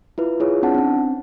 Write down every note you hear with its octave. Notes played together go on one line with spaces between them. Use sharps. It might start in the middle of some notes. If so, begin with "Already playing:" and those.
E4 F4 B4
E4 F4 G#4 C#5
C4 D4 F#5 A5
C4 C#4